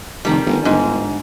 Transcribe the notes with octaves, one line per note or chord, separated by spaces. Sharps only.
F1 D#3 G3
G1
G1 G#2